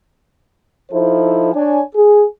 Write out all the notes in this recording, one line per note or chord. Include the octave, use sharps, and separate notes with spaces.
F3 D#4 E4 A4 C5
D4 C#5 G#5
G#4